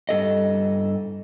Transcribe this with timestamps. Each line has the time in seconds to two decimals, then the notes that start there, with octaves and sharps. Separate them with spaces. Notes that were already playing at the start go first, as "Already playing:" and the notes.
0.09 G2 A4 D#5